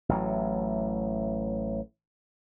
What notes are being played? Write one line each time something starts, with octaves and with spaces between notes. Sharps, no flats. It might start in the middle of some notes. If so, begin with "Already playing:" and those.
A1 A2 F#3